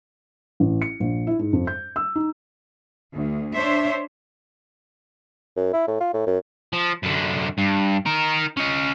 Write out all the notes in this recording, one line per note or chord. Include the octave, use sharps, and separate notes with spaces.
A1
C#7
A#1
E4
G#2
F2
G6
E6
D#4
D2
D4 C5 C#5 E5
F#2
E4
A2
F4
A2
F#2
F3
F#2 D3
G2
D#4 A#4
C#4 D#5